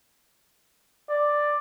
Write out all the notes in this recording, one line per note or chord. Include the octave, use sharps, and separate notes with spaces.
D5